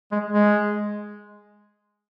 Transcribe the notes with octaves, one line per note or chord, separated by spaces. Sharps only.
G#3
G#3